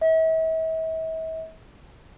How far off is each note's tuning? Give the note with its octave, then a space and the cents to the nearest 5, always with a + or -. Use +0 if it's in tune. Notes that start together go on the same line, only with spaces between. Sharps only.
E5 -40